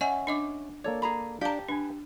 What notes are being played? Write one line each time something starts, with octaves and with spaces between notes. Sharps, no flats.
C#4 D#5 E5 F#5 G#5
D4 D#5 D6
A#3 A4 C#5 D5
G#4 A#5 B5
D4 G4 F5 G5 A5 A#5
D4 B4 G#5